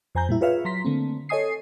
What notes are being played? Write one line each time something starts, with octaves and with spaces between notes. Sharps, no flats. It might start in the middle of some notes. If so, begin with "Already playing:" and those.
F2 C5 G#5 A#5 G6
A#2 G3 E4
F4 G#4 B4 C#5 E5 F5
F#3 A#5 C6 B6
D3 A3 A#3 C4
A4 C#5 D#5 G#5 D#6 C7